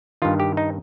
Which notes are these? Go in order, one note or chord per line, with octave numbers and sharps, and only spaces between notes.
G2 D#3 F4
G4
D#4